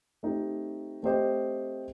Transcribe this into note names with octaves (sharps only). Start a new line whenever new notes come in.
A3 C4 D#4 G4
A3 C4 G4 C5 D#5